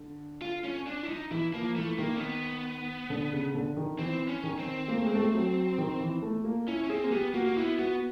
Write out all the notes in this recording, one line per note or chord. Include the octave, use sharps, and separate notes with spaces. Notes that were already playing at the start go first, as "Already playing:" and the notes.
Already playing: D3
F4
C#4
D4
E4
D#4
E3 E4
F3 A#3
E3 A3
D#3 A#3
C4
B3
D3
C#3
D3
D#3
E3 C4
C#4
D#3
C4
A#3
A3
G#3
A3
F#3
D#3
E3
A3
A#3
C#4 E4
C#4
C4 G#4
A#3
B3 G4
A#3 F#4
A#3
B3 E4
B3 F#4